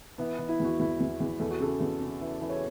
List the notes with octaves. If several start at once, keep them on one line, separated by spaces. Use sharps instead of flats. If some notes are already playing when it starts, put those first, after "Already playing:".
E3 B3
E3
E4
E2 F#4
E2 E4
E2
E2
E2 A4
F#4
C#3 A4
E2
C#3
E3
E3
C#5